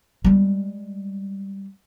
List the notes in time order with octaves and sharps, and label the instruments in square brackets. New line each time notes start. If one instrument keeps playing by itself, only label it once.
[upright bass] G3 G#3